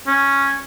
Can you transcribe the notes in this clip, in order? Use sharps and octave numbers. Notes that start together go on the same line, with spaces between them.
C#4